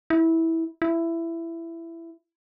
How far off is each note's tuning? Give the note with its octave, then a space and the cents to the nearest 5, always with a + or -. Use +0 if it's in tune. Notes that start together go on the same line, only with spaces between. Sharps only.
E4 -15
E4 +15